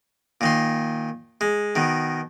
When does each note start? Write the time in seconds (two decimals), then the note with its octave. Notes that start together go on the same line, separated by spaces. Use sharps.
0.41 A#2 D#3 C6
1.41 G#3
1.76 B2 D#3